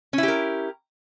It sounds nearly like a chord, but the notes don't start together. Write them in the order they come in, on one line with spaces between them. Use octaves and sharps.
C#4 E4 G4 A#4